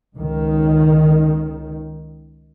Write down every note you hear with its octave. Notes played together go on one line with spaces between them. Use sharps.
C#2 D#3